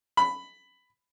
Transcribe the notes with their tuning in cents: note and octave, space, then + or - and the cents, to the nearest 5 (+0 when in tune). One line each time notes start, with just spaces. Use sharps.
B5 +10